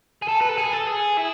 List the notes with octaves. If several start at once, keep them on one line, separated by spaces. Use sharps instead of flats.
G#4
A4
B4
A4
G#4
A4
G#4
E4